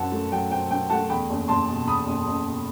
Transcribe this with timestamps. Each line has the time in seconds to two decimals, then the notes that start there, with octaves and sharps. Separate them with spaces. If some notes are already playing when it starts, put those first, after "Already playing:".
Already playing: F#2 F#3 C4 F#5 A5
0.12 A3
0.32 F#3 G5
0.51 C4 G5
0.71 F#2 G5
0.90 A3 F#5 A5
1.09 E2 G5 B5
1.29 F#1
1.48 F#1 A5 C6
1.68 B2
1.87 E2 B5 D#6
2.06 F#1
2.27 F#1
2.47 B2